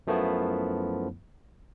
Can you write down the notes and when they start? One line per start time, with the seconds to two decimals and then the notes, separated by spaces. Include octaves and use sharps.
0.07 F#2 F3 A3 B3 E4